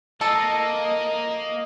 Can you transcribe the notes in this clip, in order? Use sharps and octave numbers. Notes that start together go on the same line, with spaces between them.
A#3 A4 D#5